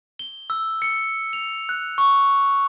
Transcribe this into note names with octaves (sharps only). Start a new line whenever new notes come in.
G7
E6
C#7
F7
F#6
C#6